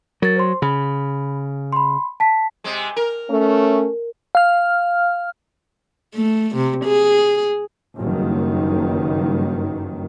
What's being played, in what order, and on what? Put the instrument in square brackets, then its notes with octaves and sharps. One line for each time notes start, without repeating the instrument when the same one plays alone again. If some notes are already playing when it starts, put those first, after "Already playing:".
[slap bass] F#3 [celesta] A#4 A6
[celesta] C5 C6
[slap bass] C#3 [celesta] B5
[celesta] B5 C6
A5 B6
[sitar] C3 G#3
A#4
[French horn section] A3 C#4
[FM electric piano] F5 F6
[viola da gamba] A3
C3
G#4
[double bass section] F#1 G2 D#3